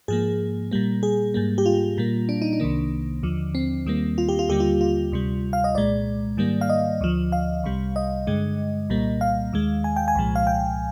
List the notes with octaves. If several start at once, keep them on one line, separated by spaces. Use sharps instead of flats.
G#2 F3 A#3 G#4
A#2 G3 A#3
G#4
G#2 G3 A#3
G4
F4
A#2 G3 A#3
D4
D#4
D4
C2 C3 D#3 A#3
D#2 D3 F3
C4
D#2 D#3 G3 A#3
F4
G4
F4
D#2 D3 G3 A#3 G4
F4
F4
D2 C3 G3
F5
D#5
C2 A#2 G#3 D5
G#2 D#3 G3 A#3
F5
D#5
D2 D3 F3
F5
C2 C3 G3
D#5
G2 D3 G#3
C2 A#2 G3 A#3
F5
D#2 D#3 G#3
G#5
G5
G#5
C2 A#2 F3 G#3
F5
G5